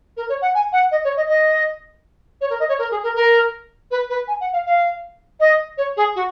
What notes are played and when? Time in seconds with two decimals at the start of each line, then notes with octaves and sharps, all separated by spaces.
0.17 A#4
0.29 C#5
0.42 F#5
0.54 G#5
0.73 F#5
0.91 D#5
1.04 C#5
1.17 D#5
1.28 D#5
2.41 C#5
2.50 A#4
2.60 D#5
2.69 C#5
2.79 A#4
2.91 G#4
3.03 A#4
3.16 A#4
3.91 B4
4.09 B4
4.28 G#5
4.41 F#5
4.53 F5
4.66 F5
5.40 D#5
5.77 C#5
5.97 G#4
6.15 F#4